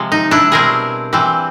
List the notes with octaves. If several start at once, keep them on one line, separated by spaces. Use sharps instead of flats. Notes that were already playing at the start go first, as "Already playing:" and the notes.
Already playing: C3 F3 G#3
D#4
D4 E4
B2 G3 C4 G#4 A#4
E3 G3 C4